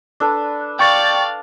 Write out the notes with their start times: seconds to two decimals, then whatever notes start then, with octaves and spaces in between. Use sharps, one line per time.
0.20 D4 A4 B4
0.79 D5 F5 G5 C#6 A6